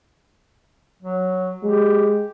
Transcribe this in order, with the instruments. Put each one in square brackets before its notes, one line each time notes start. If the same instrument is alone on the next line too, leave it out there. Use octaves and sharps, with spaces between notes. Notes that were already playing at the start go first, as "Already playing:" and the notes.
[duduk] F#3
[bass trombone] G#3 [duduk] G4